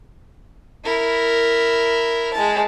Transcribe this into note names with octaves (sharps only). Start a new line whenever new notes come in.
E4 A#4
G#3 A5